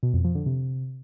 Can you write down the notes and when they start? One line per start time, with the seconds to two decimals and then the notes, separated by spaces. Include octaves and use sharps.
0.03 B2
0.14 F2
0.24 F3
0.35 D3
0.46 C3